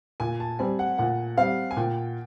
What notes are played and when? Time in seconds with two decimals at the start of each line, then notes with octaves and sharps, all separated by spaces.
0.20 A#2 G#5
0.40 A5
0.59 G3 C4 G#5
0.79 F#5
0.98 A#2 F#5
1.38 G3 C4 F5
1.71 G#5
1.77 A#2 G5